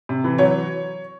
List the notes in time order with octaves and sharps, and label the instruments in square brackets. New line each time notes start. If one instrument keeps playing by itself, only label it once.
[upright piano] C3
E3
F#3 C#5